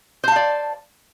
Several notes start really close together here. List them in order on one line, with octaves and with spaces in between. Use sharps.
C5 A5 F5 D5